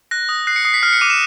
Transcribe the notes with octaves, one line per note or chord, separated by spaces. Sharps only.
F#6 A#6
D#6
F#6 C7
C#7
D#6 C7
B6
F6 C7
C#7
D6 D#7
E7